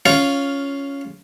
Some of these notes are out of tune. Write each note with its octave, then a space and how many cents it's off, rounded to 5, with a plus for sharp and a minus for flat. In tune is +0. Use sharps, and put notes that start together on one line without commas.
C#4 +5 F4 +0 F5 +0